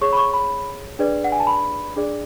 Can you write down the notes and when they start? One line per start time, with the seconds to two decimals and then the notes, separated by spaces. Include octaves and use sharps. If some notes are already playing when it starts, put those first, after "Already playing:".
0.01 G#4 C#5 C#6
0.13 B5
0.17 C#6
0.33 B5
0.99 D4 G#4 B4 D5
1.24 F#5
1.32 G#5
1.40 A5
1.47 B5
1.96 D4 G#4 D5